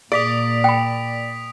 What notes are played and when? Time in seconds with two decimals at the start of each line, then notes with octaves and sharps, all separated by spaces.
0.12 A#2 A#3 G#4 D5 D#6 B6 D7
0.64 G5 B5